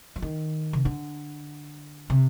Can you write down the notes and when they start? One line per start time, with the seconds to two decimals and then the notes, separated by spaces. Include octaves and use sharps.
0.16 F3
0.22 D#3
0.73 C3
0.85 D3
2.10 C3